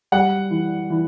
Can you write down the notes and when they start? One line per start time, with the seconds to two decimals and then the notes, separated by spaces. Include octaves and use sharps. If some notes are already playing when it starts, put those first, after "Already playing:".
0.12 G3 F#5
0.50 E3
0.90 E3